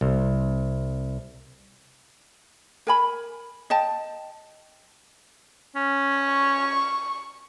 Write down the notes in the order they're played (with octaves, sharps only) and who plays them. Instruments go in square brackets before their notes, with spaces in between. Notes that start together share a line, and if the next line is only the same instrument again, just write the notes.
[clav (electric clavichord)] C2
[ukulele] A#4 G#5 B5
D#5 G5 A5
[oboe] C#4
[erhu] C#6